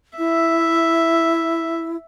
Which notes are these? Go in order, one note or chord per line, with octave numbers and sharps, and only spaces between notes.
E4 E5